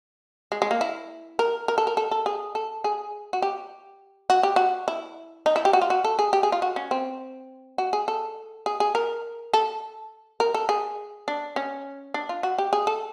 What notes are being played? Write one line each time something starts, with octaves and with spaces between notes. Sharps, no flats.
G#3
G#3
A#3
E4
A#4
A#4
A4
A#4
A4
A4
G#4
A4
G#4
F#4
G4
F#4
G4
F#4
E4
D#4
E4
G4
F#4
F4
F#4
A4
G#4
G4
G#4
F4
F#4
C#4
C4
F#4
G#4
A4
G#4
G#4
A#4
A4
A#4
A4
G#4
D4
C#4
D4
F4
F#4
G4
G#4
A4